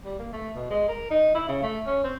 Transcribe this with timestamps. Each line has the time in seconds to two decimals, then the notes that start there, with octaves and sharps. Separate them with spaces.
0.05 G3
0.19 A#3
0.33 A3
0.56 B2
0.70 G#3
0.89 A#4
1.11 D#4
1.35 E4
1.48 C#3
1.63 A3
1.87 C#4
2.04 C4